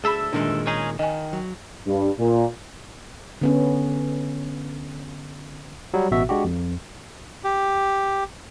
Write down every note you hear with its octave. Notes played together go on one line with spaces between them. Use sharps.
D2 G#4 A4 E5 B5
A#2 D#3 G#3 D4
C#4 D#4 G#4
D#3 D#5 G#5
F#3
G2
A#2
D3 B3 C#4
F#3 G3 F#4
A1 B2 F#4 E5
G#3 D4 F#4 G4
F2
G4